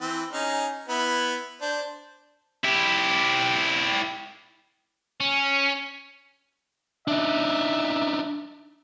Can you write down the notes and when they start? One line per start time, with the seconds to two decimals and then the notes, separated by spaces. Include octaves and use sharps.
0.01 E3 C4
0.33 C#4 D#4 G#4
0.88 B3 E4
1.62 D4 C5
2.65 E4 G4
5.21 C#4
7.08 D4 D#4 E5